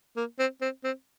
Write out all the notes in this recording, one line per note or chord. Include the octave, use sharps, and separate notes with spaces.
A#3
C4
C4
C4